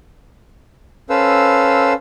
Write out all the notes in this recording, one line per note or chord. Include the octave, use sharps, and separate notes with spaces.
C#4 A4 B4 C5 F5 E6